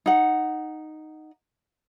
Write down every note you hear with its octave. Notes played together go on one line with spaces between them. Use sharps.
D#4 F#5